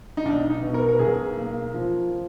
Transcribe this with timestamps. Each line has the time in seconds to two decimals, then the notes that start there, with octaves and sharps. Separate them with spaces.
0.17 D#4
0.25 B1 D4
0.50 D#4
0.62 B2
0.74 A#4
0.89 A#4
0.99 B1 G#4
1.37 A#3
1.74 F3
2.11 F3